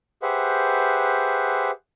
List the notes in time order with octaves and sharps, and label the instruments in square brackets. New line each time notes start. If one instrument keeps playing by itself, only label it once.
[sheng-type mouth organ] G4 G#4 B4 C5 E5 F#5